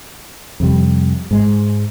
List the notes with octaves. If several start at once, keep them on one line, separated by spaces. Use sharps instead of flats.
F2 C3 G3
G#2 G#3